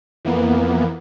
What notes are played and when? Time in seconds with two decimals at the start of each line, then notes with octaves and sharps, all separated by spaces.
0.25 F2 E3 A#3 B3